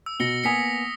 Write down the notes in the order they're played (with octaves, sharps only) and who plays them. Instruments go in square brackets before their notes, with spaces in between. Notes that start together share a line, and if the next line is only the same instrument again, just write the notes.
[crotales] E6
[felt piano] B2 [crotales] A#6 C#7 G7
[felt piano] A#3 B3 G#5 [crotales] D#6 B6 C#7